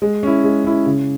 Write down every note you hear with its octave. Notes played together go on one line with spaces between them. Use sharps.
G#3
C#4 E4
G#3
C#4 E4
C#3